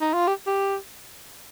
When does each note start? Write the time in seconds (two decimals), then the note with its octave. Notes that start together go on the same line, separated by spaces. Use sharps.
0.01 D#4
0.14 F4
0.27 G4
0.47 G4